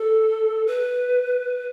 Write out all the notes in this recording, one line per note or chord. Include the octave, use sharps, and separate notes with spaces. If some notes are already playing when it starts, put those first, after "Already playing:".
Already playing: A4
B4